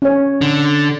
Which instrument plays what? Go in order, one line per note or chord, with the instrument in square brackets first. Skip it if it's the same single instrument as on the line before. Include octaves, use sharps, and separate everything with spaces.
[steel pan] C#4 C#5
[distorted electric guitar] D3